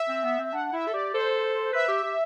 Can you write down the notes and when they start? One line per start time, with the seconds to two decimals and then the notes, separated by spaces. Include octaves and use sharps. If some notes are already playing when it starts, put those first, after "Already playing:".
Already playing: E5
0.09 C4
0.24 B3
0.39 C4
0.44 E5
0.53 D4 F#5
0.73 E4 E5
0.88 A4
0.93 G4 D5
1.13 A4 C5
1.73 B4 E5
1.88 G4
2.03 G4